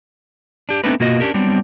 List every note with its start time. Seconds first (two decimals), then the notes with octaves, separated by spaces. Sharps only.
0.69 D4 G4
0.84 A3 B3 C4 D4 D#4 B4
1.00 B2 A#3 F4 F#4 D#5
1.20 C#4 D4 G4 A#4
1.34 F#3 G3 B3 C4 D4